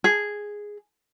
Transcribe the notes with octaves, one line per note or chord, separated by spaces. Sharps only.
G#4